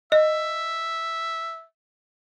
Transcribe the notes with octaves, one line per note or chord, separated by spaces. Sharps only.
D#5 E5